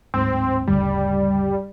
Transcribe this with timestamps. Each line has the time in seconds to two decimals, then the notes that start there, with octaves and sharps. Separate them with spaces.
0.14 D1 G#2 C4
0.67 G1 D2 C#3 G3